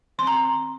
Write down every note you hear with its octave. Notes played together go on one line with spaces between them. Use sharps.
D#3 C4 C6
A#5